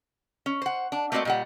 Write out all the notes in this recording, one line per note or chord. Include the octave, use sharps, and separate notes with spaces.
C#4
C5 F#5
D4
A3 A#3 C4 F#4 D5 D#5
A#2 G3 F#5